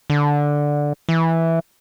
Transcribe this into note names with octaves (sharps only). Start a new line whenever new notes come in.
D3
E3